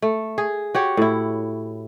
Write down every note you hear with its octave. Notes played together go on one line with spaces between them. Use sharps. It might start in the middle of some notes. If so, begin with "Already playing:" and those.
A3
G#4
F#4 G4 C#5
A2 E4